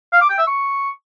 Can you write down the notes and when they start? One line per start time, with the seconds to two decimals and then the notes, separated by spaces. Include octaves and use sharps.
0.13 F5
0.21 D6
0.30 G5
0.38 E5
0.47 C#6